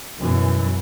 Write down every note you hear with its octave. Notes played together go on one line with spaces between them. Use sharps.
F#2 B2 E3